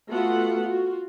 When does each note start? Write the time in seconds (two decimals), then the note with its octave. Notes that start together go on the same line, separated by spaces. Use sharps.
0.11 A3 B3 F4 F#4 A4 F#5
0.63 F4 F#4